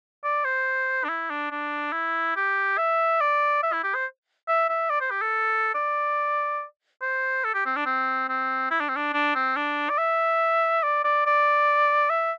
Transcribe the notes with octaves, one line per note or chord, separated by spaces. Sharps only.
D5
C5
D4
E4
D4
D4
E4
G4
E5
D5
E5
E4
G4
C5
E5
E5
D5
C5
G4
A4
D5
C5
A4
G4
C4
D4
C4
C4
E4
D4
C4
D4
D4
C4
D4
D5
E5
D5
D5
D5
E5